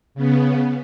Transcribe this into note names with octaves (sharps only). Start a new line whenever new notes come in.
C#3 B3